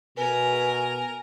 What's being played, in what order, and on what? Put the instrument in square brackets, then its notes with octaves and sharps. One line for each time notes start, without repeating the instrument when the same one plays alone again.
[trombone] B2 [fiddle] A#4 [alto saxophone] B4 [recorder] G#5